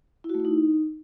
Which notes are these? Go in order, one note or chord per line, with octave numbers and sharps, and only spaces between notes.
E4
F#4
A3
E4
D#4